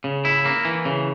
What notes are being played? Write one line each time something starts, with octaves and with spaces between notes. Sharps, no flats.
C#3
E4
A#3
E3
C#3